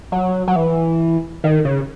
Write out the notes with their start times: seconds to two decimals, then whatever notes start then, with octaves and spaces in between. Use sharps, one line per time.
0.12 F#3
0.48 F#3
0.56 E3
1.44 D#3
1.65 C#3